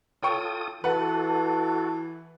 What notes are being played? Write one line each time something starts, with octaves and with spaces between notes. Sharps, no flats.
F4 A4 C#5 G5 C#6 D#6
E3 F#4 A4 B4 F#5 A5